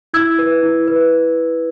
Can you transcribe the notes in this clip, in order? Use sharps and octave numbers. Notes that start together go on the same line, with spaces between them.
E4 E6 G#6
B4
E4
B4